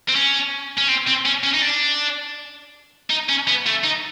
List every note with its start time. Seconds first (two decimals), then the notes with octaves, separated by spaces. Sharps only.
0.08 C4
0.15 C#4
0.78 C#4
0.89 C4
1.08 C4
1.26 C#4
1.44 C#4
1.54 D#4
1.62 D4
3.10 D#4
3.29 C#4
3.48 B3
3.66 A3
3.84 D#4